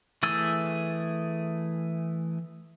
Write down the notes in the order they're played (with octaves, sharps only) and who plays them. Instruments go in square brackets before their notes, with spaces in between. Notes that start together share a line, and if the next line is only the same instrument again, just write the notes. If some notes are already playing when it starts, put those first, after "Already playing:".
[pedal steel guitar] E3 A3 G#4 E6